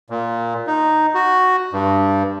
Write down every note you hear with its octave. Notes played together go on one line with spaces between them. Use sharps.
A#2
D#4
F#4
G2